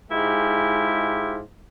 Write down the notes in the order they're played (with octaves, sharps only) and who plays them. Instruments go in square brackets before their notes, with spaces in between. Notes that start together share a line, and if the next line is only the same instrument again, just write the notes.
[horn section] G#2 G#3 E4 F4 G4